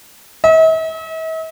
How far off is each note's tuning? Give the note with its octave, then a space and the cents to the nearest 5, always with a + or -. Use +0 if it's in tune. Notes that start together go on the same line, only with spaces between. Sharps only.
E5 -45